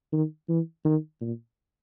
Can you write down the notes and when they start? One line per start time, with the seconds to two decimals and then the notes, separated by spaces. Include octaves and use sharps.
0.12 D#3
0.49 E3
0.84 D#3
1.21 A#2